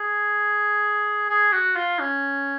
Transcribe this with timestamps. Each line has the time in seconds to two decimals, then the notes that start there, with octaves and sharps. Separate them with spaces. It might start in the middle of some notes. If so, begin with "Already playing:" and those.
Already playing: G#4
1.30 G#4
1.52 F#4
1.76 F4
1.99 C#4